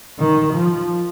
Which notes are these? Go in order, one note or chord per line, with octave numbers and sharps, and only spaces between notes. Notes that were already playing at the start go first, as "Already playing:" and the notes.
D#3
F3